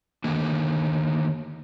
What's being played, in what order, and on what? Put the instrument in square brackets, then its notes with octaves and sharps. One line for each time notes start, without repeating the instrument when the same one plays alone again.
[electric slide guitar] D3 D#3 A#3